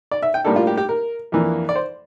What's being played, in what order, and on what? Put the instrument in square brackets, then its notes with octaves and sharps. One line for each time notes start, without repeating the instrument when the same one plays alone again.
[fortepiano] D5
E5
G5
A2 G3 A#3 D4 A4
F4
G4
G4
A#4
F2 E3 A#3 D4
D5
C5